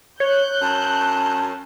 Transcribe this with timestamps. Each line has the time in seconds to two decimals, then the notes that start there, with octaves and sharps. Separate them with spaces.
0.20 C#5 F#6 G6
0.62 F#2 A5